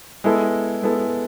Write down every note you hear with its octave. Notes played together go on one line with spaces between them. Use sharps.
G#3 B3 E4 A4
G#3 B3 E4 A4